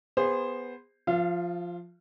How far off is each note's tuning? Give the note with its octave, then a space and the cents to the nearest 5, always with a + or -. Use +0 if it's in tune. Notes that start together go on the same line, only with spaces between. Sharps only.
B3 +0 G#4 -30 C5 +0
F3 +0 F4 +0 F5 -40